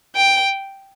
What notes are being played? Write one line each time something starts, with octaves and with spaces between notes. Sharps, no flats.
G5